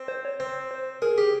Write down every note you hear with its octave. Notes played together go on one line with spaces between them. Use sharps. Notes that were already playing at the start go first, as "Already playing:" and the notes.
Already playing: C4
C5
C#5
C4 C5
C5
G#4 A#4
G4 G#4